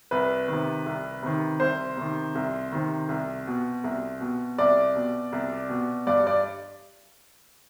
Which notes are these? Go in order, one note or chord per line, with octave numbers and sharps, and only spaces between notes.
C2 B4
C3 D#3
C2
C3 D#3
C2 C5
C3 D#3
C2
C3 D#3
C2
B2
C2
B2
C2 D5
B2
C2
B2
G2 D5
D5